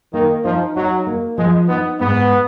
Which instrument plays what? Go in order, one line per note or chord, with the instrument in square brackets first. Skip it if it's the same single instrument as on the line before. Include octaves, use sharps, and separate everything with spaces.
[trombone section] D#3 [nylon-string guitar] A#3
[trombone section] F3 [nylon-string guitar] D#4
[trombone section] F#3 [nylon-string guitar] D#4
[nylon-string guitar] A#3
[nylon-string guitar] F3 [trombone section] G#3
[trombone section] B3 [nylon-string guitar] D#4
[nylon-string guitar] G#2 [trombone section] B3